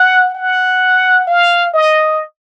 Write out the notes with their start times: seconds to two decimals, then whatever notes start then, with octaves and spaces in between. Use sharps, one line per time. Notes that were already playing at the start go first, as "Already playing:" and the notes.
Already playing: F#5
0.35 F#5
1.27 F5
1.73 D#5